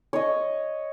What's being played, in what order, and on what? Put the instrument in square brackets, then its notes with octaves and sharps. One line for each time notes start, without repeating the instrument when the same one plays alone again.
[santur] C#5 D#5